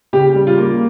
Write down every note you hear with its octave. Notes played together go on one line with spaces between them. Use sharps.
C#3 G4
G3
F4
A#3